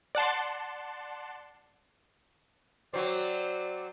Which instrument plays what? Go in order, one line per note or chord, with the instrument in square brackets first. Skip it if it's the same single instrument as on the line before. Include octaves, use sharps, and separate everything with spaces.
[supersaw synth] D5 F#5 A5 C6
[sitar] F#3 C4 [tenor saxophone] D5